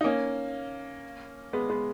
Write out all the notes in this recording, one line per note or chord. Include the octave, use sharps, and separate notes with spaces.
D#4
A#3 C#4
G#3 B3
G#3 B3